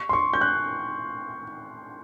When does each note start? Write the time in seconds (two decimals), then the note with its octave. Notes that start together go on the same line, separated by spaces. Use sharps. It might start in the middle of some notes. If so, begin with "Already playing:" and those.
Already playing: C#6
0.09 C6
0.13 C#6
0.33 G6
0.41 F#6